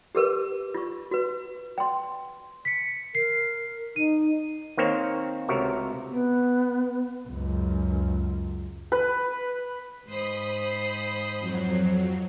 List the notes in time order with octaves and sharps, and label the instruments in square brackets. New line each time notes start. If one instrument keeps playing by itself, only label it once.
[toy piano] G4 G#4 A#4 B4
F4 C#6
F#4 B4
G5 C6
[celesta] B6 C#7
[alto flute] A#4 [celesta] C7
[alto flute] D#4 [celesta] D#7
[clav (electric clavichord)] D#3 A#3 C4 C5 C#5
C#2 C3 A3 F#4 A#4 C#5
[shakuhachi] B3
[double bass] C#2 F#2
[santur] B4
[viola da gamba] G#2 C5 [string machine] B5 D#6
[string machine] F2 F#3